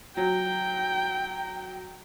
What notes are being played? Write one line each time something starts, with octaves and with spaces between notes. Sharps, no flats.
F#3 G5